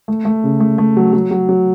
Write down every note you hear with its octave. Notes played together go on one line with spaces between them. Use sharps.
A3
A3
C#3
A3
A3
F#3
F#3
F#3
F#3